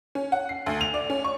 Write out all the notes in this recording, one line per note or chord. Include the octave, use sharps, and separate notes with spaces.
C#4
F#5
C7
D2
F7
D5
C#4
C#6